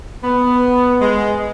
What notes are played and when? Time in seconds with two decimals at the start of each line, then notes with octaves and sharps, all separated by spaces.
0.24 B3
1.00 G#3